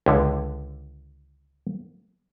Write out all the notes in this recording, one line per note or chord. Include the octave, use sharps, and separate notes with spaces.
C#2 D3